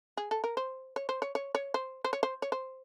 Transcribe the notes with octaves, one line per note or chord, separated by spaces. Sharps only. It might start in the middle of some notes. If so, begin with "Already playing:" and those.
G#4
A4
A#4
C5
C#5
C5
C#5
C#5
C#5
C5
C5
C#5
C5
C#5
C5